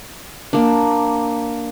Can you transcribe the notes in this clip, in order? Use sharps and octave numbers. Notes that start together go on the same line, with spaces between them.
A#3 D4